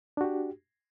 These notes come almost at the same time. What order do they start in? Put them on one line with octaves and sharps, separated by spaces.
D4 F#4 G4